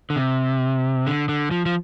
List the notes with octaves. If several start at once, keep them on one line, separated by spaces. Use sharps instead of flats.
D3
C3
D3
D3
F3
F3